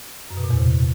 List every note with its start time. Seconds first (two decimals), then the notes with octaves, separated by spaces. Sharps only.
0.30 F#2
0.37 B2
0.44 A#2
0.51 E2
0.57 C3